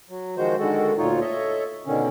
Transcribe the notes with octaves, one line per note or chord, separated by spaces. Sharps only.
F#3
D#3 F3 G#3 F#4 C5
D3 D#3 G#3 F#4 A4
D2 A#2 D#4 F4 C#5
A4 C#5 D#5 E5
B2 D3 D#3 C#4